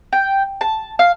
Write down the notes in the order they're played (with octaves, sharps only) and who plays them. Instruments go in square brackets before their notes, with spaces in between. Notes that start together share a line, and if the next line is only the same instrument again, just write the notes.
[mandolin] G5
A5
F5